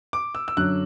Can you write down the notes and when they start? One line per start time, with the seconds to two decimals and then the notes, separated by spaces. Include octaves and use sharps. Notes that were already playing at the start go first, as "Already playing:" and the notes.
0.13 D6
0.35 E6
0.48 E6
0.57 F#2 D3 F#3 F#6